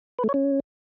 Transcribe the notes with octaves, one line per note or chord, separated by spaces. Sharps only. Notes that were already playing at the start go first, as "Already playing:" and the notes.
B4
A3
C#5
C#4